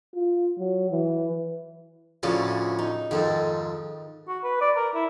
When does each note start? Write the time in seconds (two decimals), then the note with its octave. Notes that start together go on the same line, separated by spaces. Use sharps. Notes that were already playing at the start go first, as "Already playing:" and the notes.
0.15 F4
0.59 F#3
0.91 E3
2.23 D2 A2 C#3 F3 C#4 A5
2.79 D#4
3.11 F2 G#2 D#3 A4
4.28 F#4
4.44 B4
4.61 D5
4.76 A#4
4.95 E4